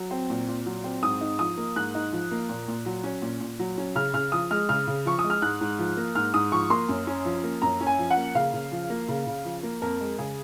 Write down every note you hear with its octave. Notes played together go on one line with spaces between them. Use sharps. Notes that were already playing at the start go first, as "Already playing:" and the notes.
Already playing: F#3
C4
A#2
A#2
F#3
C4
G#2 D#6
D#4
F3 D#6
A#3
G#2 F#6
D#4
F3
A#3
A#2
A#2
F#3
C#4
A#2
A#2
F#3
C#4
C#3 F6
C#3 F6
F3 D#6
G#3 F6
C#3 F6
C#3
F3 C#6
D#6
G#3
F6
G#2 F#6
G#2
F3
A#3
G#2 F6
G#2 D#6
F3 C#6
A#3 C6
F#2
C#4
F3
A#3
F#2 A#5
C#4
G#5
F3
F#5
A#3
C#3 F5
C#3
F3
A#3
C#3
C#3
F3
A#3
F2 A#4
G#3
C#3 G#4